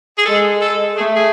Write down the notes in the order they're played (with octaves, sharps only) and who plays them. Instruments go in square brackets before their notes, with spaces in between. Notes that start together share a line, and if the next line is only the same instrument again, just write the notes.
[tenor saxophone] G#4
[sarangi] G#3 [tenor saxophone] A4
[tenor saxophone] A4
[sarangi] A3 [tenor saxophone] G#4
[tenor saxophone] G#4